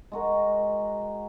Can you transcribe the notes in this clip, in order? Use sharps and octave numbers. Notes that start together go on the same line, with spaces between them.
G#3 F#4 A#4